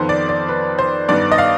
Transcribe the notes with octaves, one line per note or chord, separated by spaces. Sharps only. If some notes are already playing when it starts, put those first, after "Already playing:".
Already playing: F2 D#3 B3 C5
D5
D5
B4
C5
G2 D#3 B3 D5
D#5
F5